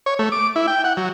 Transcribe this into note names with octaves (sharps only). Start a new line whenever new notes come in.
C#5
A3
D6
E4
G5
F#5
F#3